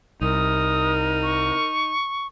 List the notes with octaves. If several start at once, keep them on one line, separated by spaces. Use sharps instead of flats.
C2 D#4 A#4 D#6
C#6